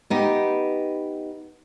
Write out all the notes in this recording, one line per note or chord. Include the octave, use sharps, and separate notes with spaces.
B3 D#4 G4